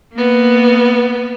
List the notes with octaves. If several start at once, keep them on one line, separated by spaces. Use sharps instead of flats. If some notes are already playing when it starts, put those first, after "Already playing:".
A#3 B3